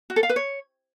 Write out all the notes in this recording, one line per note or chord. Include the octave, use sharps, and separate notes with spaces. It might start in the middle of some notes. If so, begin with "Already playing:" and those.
F#4
A4
F5
B4
C#5